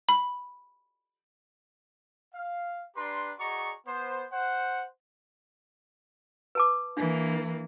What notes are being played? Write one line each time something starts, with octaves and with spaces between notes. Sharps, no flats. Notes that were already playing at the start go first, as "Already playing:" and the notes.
B5
F5
D4 G4 B4 A#5 C6
F#4 G#4 D5 D#5 A#5 C#6
B3 C5
C5 F#5
B4 A5 D6
E3 A#3 D4